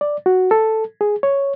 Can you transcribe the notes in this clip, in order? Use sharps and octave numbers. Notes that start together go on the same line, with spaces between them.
D5
F#4
A4
G#4
C#5